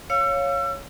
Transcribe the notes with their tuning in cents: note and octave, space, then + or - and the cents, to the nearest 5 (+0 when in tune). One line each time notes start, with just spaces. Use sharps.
C#5 +0 F5 +0 E6 +35